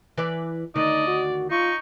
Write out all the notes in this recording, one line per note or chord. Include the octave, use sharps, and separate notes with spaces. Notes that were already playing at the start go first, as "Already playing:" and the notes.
E3 B4 D5
D2 D#3 D4 D#4 D5 D#5
F#4
D#4 F4 C#6